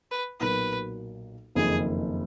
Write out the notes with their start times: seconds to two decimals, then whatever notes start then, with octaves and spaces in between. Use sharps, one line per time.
0.11 B4
0.40 B1 A#2 F#3 A#3 B4
1.55 F#1 F2 D#3 G#4